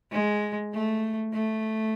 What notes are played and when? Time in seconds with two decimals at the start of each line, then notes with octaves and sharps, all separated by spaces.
0.12 G#3
0.74 A3
1.34 A3